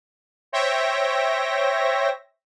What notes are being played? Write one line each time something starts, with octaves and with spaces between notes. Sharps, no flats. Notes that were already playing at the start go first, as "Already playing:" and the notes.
C5 C#5 E5 G5 A#6